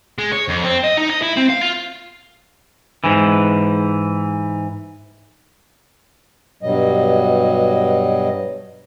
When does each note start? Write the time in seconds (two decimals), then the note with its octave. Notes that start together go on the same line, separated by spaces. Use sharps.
0.18 G#3
0.32 C#5
0.49 F2
0.65 C4
0.84 D#5
0.97 D#4
1.09 D#5
1.22 E4
1.37 C4
1.49 F5
1.61 F4
3.04 G#2 E3
6.63 G2 B2 F#3 G3 D#5